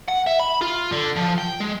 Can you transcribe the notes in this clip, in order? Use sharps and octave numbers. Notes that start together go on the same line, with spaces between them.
F#5
E5
B5
F4
D3
F3
G5
G#3